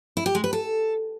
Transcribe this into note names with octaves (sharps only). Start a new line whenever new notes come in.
E4
G4
G#3
B4
A4